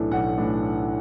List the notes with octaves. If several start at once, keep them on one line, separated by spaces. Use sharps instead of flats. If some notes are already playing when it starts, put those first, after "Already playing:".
Already playing: B1 A2 E3 A3 D4
B1 F#5
A2 E3 A3 D4